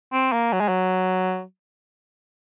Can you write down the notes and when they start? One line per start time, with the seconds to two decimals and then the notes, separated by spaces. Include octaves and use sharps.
0.13 C4
0.33 A#3
0.53 F#3
0.61 G#3
0.69 F#3